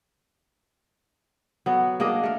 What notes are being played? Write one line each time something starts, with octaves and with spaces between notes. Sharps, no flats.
F#3 B3 A4
A#3 D4 G#4 D#5
A3 A#4